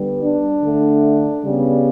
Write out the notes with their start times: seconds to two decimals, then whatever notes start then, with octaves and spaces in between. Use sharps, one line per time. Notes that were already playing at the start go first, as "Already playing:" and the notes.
Already playing: D3 G3 B3
0.21 D4
0.61 D3 A3
1.42 C#3 G3 B3